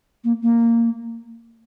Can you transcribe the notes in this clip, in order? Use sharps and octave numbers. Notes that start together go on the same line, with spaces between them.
A#3
A#3